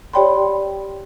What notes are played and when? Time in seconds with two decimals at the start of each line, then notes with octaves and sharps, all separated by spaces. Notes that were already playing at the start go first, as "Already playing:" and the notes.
0.14 G4 C#5 D5 G5 B5 C6